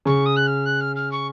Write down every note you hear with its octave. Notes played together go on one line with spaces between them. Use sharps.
C#3 C#6
D#6
F#6
F6
F#6
F6
F6
C#6